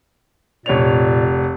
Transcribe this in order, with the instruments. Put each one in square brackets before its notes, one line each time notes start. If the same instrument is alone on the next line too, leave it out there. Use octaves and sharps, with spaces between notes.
[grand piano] F1 C#5 F7 [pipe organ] A#2 D5